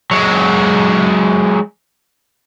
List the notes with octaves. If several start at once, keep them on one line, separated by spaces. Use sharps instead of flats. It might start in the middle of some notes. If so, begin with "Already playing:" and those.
F#3 G#3